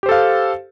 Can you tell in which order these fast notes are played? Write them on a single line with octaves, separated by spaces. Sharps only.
G4 C5 A4 F5